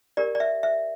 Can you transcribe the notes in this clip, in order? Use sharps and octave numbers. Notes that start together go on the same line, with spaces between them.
D4 G4 A#4 D5
D5
E5
E5